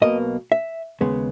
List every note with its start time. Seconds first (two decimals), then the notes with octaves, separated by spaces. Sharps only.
0.02 B1 B2 A#3 D#5
0.52 E5
1.01 D#2 C#3 G#3 B3